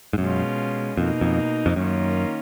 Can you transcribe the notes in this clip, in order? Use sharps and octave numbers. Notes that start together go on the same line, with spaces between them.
G#2
F#2 B2 G#3 C#4 F4
F2 B2 A#3 D#4
F2
F2
F#2 D#3 A#3 C#4 F4